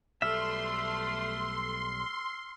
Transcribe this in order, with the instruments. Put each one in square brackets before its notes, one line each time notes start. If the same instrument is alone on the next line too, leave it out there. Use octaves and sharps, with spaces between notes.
[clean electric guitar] B1 G3 E5 [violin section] A3 [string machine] C6 [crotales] E6 F6